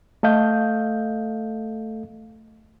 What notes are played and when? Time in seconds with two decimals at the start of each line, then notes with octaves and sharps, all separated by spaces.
0.23 A3 A4 D#5 F5 G6